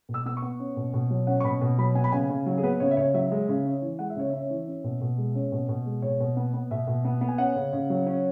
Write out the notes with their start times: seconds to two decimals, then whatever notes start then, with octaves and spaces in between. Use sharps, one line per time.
0.09 B2
0.14 E6
0.26 B3 E6
0.37 C#6
0.42 B3
0.60 C#4
0.77 B2
0.94 B2
1.11 F#3
1.27 C#4 F#5
1.40 C#6
1.44 B2 B5
1.61 B2
1.78 F#3 B5
1.95 B3 G#5
2.04 B5
2.12 C#3 G#5
2.29 C#3
2.46 F#3
2.58 G#4
2.63 B3 B4
2.80 C#3 C#5
2.91 E5
2.97 C#3 C#5
3.14 F#3 E5
3.31 G#3
3.49 C#3
3.65 C#4
3.82 E3
3.99 G#3 F#5
4.10 E5
4.16 C#3 C#5
4.30 C#4 E5
4.50 E3
4.67 C#4
4.84 B2
5.01 B2
5.18 G#3
5.35 C#4
5.52 B2
5.69 B2
5.86 G#3
6.02 B2 C#5
6.20 B2
6.37 B3
6.54 B3
6.71 B2 E5
6.87 B2
7.05 B3
7.21 B3
7.28 G#5
7.38 C#4 F#5
7.56 C#3
7.73 C#3
7.90 F#3
8.06 C#4